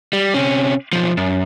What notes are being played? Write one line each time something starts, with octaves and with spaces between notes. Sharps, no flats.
G3
C3 C#4
B1 F3
F#2